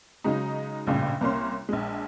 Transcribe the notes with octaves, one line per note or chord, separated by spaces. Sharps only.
C#3 F#3 G#3 D#4
A1 G2 A#2 C#3
C2 A#3 C#4 C6
A#1 G#3